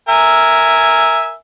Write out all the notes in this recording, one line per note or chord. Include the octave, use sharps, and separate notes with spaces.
A#4 E5 G#5